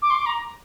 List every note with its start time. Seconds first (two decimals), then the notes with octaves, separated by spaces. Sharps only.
0.02 D6
0.10 C6
0.19 D6
0.26 A#5